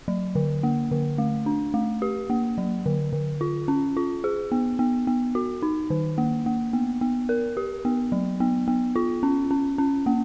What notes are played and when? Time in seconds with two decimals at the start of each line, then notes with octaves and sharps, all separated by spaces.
0.08 F#3
0.35 D3
0.63 A#3
0.91 D3
1.18 A3
1.46 D4
1.74 A3
2.02 G4
2.30 A#3
2.58 F#3
2.86 D3
3.13 D3
3.41 F4
3.68 C#4
3.97 F4
4.24 G#4
4.52 B3
4.79 B3
5.07 B3
5.35 F#4
5.62 D#4
5.90 D#3
6.18 A#3
6.46 A#3
6.73 B3
7.01 B3
7.29 A#4
7.57 G4
7.85 B3
8.12 F#3
8.40 B3
8.68 B3
8.96 F4
9.23 C#4
9.51 C#4
9.78 C#4
10.06 A#3